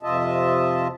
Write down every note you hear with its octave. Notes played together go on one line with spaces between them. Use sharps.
F2 C3 F4 D#5 E5 A5